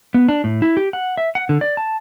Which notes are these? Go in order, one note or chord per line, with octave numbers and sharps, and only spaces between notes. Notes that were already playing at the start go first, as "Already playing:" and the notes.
B3
D4
A2
E4
G4
F#5
E5
F#5
D3
D5
A5